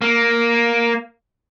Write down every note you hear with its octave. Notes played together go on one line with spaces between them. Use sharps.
A#3